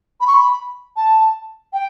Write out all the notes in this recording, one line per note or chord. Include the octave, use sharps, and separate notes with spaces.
B5
C#6
B5
A5
G5